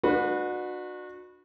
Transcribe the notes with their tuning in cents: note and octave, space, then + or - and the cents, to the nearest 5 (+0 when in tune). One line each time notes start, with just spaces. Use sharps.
D4 +40 F#4 -25 B4 +0